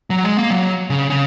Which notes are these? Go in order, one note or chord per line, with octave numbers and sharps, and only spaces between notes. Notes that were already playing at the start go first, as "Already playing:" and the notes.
F#3
G#3
A#3
F#3
C#3
C#3